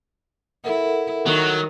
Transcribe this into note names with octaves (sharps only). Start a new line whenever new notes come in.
E4 A4 A#4 F#5
D#3 F#3